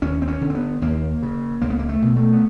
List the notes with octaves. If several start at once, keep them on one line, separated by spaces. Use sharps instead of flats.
D#2 C#4
C4
C#4
D3
C4
B3
D#2 A#3
C#3
C#2 A#3
B3
A#3
A3
B2
A3
B3